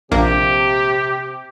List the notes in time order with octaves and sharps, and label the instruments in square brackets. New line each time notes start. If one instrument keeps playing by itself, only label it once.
[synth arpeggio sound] A#1 A#3 [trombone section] C3 [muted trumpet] G4